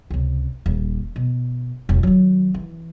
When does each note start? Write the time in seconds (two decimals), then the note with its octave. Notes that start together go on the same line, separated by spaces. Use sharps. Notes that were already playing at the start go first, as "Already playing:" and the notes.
0.10 C#2 C3
0.66 D#1
1.16 B2
1.89 E1 C#2
2.03 D#3 F#3
2.54 E3